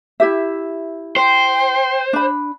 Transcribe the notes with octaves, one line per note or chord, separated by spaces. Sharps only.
E4 G4 E5
C5 G5
D4 B5